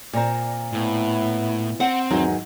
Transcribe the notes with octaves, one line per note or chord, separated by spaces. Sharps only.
A#2 C4 D5 A#5
A2 B3 E4
C4 F#5
E2 G#2 D#3 F#3